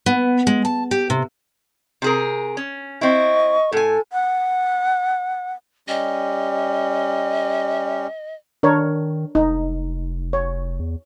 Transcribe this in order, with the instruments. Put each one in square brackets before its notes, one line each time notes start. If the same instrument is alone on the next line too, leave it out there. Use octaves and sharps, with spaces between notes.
[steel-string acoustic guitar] B3
G#3
A5
G4
C3
[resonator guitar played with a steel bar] C3 G#4 A#4
C#4
[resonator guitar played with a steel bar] C4 E4 [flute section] D#5 C#6
[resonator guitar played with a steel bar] A2 G#5 [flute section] A4
[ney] F#5
[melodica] G3 C#4 G4 [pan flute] D#5
[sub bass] D#3 [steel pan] D4 A#4 C#5
[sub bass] F1 [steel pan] D#4
[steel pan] C#5
[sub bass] E2